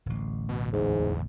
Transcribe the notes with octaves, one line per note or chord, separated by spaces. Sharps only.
D1 A1
B2
E2 G#2